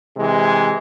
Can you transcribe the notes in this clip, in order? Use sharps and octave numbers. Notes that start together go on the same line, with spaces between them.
C3 E3 G#3